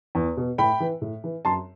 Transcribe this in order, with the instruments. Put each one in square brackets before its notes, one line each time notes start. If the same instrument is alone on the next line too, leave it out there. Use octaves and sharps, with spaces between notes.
[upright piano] E2
B2
A2 G5 B5
E3
A2
E3
F#2 A5 C6